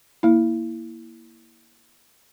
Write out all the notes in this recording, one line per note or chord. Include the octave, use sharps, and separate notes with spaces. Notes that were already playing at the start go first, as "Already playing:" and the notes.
A#3 E4